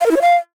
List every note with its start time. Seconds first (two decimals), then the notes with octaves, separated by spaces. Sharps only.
0.01 F5
0.06 A#4
0.11 E4
0.16 C#5
0.21 F5